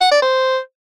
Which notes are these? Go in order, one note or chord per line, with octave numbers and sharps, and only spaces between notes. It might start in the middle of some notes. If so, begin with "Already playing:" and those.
F#5
D5
C5